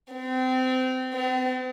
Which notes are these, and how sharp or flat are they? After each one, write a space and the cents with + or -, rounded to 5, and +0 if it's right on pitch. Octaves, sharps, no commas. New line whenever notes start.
C4 -25
C4 -45